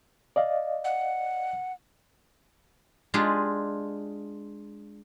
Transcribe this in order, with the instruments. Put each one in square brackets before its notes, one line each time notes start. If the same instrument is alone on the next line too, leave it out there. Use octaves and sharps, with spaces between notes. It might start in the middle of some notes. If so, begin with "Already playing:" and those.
[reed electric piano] D5 D#5 F5
[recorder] F#5
[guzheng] G#3 D4 F4 G4 G#4